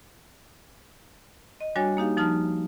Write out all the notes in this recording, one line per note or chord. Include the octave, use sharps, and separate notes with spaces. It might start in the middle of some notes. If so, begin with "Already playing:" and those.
D#5
G3 D4 F#4 C#5 G#5 A6
A#3 D#4 G4 F5
F3 D#4 A5 F6